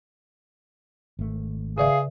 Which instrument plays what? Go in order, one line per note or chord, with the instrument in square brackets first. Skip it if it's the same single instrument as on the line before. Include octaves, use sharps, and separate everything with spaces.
[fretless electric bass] G#1 A3
[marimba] C#3 D5 E5 [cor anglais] G#4 [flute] F5